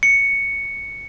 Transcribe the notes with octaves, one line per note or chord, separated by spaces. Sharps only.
C#7